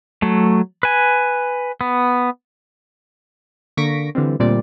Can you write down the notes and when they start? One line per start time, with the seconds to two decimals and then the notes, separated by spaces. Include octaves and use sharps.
0.22 F#3 A3
0.83 B4 G#5
1.81 B3
3.77 D3 A#3 C#6 A#6 B6 D7
4.15 D3 E3 G3 C4
4.39 D2 A#2 G3 C4 D5